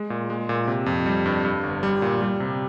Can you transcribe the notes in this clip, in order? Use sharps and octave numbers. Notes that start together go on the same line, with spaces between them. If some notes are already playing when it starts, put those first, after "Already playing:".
Already playing: G#3
A#2
G#3
A#2
C3
F2
G3
G2
G2
G1
G3
A#2
G3
C3